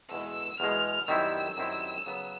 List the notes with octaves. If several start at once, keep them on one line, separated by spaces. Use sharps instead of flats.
E2 B2 G#3 E6
E2 B2 G#3 F6
F#2 D#3 G3 C4 E4 E6
F#2 D#3 G3 C4 E4
C#3 F#3 B3